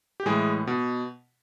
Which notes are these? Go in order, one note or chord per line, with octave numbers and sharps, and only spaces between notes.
G4
A2 E3 G#3 G#4
B2